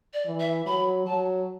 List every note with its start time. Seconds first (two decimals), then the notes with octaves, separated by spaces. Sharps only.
0.13 D5
0.26 E3
0.39 E5
0.66 F#3 B5
1.06 F#3 A5